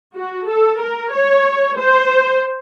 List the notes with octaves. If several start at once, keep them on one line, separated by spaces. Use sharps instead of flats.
F#4
A4
A#4
C#5
C5